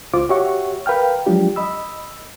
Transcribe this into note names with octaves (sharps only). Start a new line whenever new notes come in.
C#2 F4 C5 D6
F#4 G4 C#5 E5 F#5 C#6
A#4 B4 F5 G5 F6
F3 F#3 G#3 D4 F4 G4
D#5 B5 E6